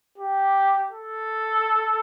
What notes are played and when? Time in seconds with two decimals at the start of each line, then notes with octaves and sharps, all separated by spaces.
0.18 G4
0.91 A4